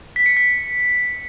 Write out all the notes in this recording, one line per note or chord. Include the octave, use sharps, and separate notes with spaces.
B6
C#7
B6